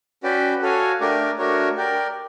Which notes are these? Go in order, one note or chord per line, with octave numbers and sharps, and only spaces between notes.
C#4 F#4 B4 D5 G5
F#4 A4 C#5 F5 G#5
A3 D4 G4 A#4 D5
A3 D4 F#4 A#4 C#5
G4 A#4 D5 G5